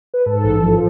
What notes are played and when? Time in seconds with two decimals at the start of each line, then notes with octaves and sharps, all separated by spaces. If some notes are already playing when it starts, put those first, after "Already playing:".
0.14 B4
0.26 G#2 A4
0.44 A1
0.63 F3